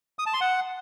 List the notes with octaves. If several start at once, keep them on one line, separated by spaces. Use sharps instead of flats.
D#6
A5
C6
F#5